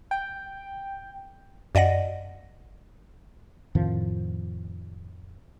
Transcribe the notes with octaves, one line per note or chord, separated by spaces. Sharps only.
G5
F#2 D5 D#5 F#5 A#6
F2 A2 D#3 F3